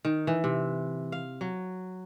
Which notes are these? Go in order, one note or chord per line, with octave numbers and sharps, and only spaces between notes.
D#3
E3
C3
F5
F#3